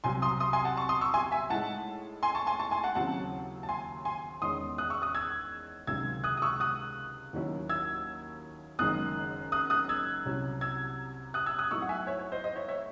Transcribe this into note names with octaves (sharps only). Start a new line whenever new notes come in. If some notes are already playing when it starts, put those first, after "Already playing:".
C2 C3 F#3 C4 G#5 C6
C6 D#6
C6 D#6
G#5 C6
F#5 A5
A5 C#6
C6 D#6
C#6 E6
G#5 C6
E5 G#5
A2 G#3 D#4 F#5 A5
G#5 C6
A5 C#6
G#5 C6
A5 C#6
G#5 C6
F#5 A5
D#2 C#3 F#3 C4 E4 F#5 A5
A5
G#5 C6
G#5 C6
E2 D#3 G#3 C#4 C6 D#6
D#6 F#6
C#6 E6
D#6 F#6
E6 G#6
C#2 C3 D#3 F#3 C4 E6 G#6
D#6 F#6
D#6
C#6 E6
D#6 F#6
D#2 D#3 F#3 C#4 E4
E6 G#6
F#1 F#2 D#3 G#3 D#6 F#6
D#6 F#6
D#6 F#6
E6 G#6
C2 C3 F#3 C#4 E4
E6 G#6
D#6 F#6
E6 G#6
D#6 F#6
A2 F#3 A3 D#4 C#6 E6
F#5
E5 G#5
C#5 E5
C#5
C5 D#5
C5 D#5
C#5 E5
C#5 E5